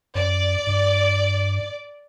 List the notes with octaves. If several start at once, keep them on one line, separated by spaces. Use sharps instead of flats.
F#2 D5
G2